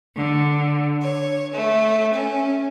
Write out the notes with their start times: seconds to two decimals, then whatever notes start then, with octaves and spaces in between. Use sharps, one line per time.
0.15 D3
1.00 C#5
1.53 A3
2.12 C#4